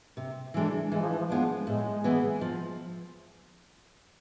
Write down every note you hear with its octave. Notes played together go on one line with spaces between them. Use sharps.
C3
E3 G#3 D4 A4
E3 G#3
F3
E3
F3
F3 G#3 B3 D4
A2 G#3
E3 B3 E4 G#4
F3